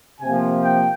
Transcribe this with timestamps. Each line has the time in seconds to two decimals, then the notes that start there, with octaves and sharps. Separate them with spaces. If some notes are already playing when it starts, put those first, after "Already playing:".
0.21 C3 F3 A#3 G#5
0.63 G5